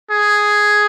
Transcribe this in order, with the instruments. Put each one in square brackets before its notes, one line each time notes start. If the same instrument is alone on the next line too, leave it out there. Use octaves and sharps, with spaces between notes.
[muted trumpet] G#4